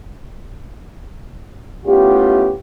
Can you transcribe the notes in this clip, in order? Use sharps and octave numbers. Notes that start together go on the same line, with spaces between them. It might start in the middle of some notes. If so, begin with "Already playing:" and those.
A3 B3 C#4 E4 F4 G4